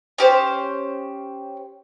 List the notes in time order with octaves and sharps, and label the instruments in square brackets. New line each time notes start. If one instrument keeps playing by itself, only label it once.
[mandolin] C#4 G4 C5